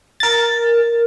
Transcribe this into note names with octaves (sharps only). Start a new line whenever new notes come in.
A#4 A6